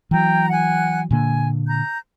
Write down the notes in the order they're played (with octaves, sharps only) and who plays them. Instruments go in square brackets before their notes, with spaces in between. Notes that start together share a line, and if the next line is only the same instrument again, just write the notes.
[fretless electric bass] E3 F#3 [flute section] G5 A#5
[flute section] F#5 G#5 F#6
[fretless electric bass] A#2 D3 A#3 [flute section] G#5
[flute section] A#5 G6